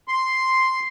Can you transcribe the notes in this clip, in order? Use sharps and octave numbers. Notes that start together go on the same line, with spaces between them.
C6